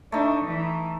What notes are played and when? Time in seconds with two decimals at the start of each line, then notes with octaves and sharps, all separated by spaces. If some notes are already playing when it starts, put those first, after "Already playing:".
0.12 A3 D4 D#4
0.45 E3